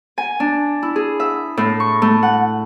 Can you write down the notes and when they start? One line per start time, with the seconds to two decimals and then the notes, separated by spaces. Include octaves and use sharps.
0.18 G#5
0.40 D4
0.82 E4
0.96 G#4
1.20 E5
1.57 A2
1.80 C#6
2.02 A3
2.23 F#5